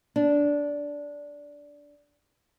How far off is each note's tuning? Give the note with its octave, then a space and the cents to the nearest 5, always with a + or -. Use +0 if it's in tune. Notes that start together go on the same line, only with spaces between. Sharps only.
D4 -15